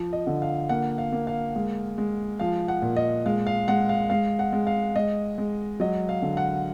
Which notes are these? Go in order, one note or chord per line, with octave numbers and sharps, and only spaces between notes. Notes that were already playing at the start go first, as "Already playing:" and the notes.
Already playing: F3
D#5
D3
F5
A#3 F#5
F5
A#3
F5
G#3
G#3
F3 F5
F#5
A#2
D#5
G#3 F5
F5
G#3 F#5
F5
G#3 F5
F#5
G#3
F5
G#3 D#5
G#3
F#3 D#5
F5
D3
F#5